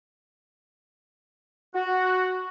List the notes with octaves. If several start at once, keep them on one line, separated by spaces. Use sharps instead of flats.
F#4